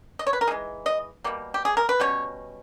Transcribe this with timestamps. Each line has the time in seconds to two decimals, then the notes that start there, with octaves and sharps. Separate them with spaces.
0.19 D#5
0.27 C#5
0.33 B4
0.41 A#4
0.47 E3 G#3 D#4 G#4
0.86 D#5
1.24 B2 G3 A#3
1.54 G4
1.65 G#4
1.77 A#4
1.89 B4
2.00 B2 G3 C#4 C#5